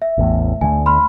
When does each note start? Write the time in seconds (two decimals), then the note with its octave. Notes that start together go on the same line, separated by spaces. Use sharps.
0.02 E5
0.18 A1 E2 A2
0.61 D2 E3 A3 G#5
0.86 B5 C6 F6